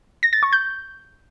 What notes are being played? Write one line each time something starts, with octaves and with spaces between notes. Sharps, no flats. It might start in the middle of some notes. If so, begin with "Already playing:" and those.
A#6
A6
C#6
G6